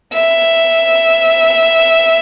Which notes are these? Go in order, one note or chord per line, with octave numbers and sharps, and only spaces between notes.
E5